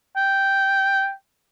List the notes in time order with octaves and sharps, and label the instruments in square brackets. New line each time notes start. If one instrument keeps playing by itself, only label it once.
[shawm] G5